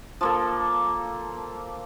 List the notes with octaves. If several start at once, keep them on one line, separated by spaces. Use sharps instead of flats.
F3 A#3 A4